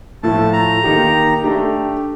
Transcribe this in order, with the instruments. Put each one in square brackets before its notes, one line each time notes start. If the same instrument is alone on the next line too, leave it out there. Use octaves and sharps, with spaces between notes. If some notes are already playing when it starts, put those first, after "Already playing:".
[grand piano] A2 F3 A3 [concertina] A5
[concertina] A#5
[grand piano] D#3 A#3 D#4 G4
A3 D4 G4